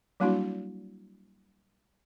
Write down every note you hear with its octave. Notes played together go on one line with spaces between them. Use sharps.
F#3 G3 A#3 D4 E4 F#4